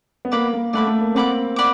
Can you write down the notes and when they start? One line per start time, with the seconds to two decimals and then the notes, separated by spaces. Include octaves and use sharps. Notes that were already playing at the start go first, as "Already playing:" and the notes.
0.25 B3
0.32 A#3 D5 F#5 B5 D6
0.54 A#3
0.73 A3 D5 F#5 B5 D6
0.87 A3
1.01 A#3
1.15 A#3 C4 D5 F#5 B5 D6
1.56 D5 F#5 B5 D6